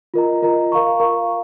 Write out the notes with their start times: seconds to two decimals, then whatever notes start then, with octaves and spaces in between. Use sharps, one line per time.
0.14 F4 A#4 D#5 A#5
0.42 F4 A#4 D#5 A#5
0.72 A#4 F5 A#5 C#6
1.00 A#4 F5 A#5 C#6